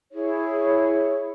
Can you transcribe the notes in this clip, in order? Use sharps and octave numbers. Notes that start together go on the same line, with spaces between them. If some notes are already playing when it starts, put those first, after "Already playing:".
E4 G#4 C#5